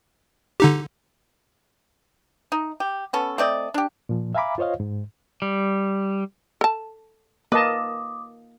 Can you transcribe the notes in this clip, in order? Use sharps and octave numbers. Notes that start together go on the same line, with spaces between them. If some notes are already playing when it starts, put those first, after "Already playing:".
D3 D#4 G4
D#4
G4
B3 C#4 A4
A3 C4 D5 D#5
D4 G4
A#2 F3
E5 F5 G#5 A#5 B5 D6
F4 C5 C#5 D#5 F5
G#2
G3
A4 A5
A#3 B4 D#5 A5 D6 D#6